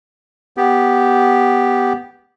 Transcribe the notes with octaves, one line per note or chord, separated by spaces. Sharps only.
B3 G4